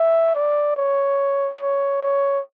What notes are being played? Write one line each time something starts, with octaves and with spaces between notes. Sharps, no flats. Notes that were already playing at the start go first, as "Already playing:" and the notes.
Already playing: E5
D5
C#5
C#5
C#5